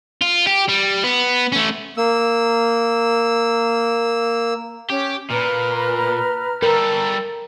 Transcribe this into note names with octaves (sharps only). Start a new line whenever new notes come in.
F4
G4
G3
B3
A3 C#4
A#3 E6
C#4 G4
A#2 B4 A#5 F6
G3 A4 A#4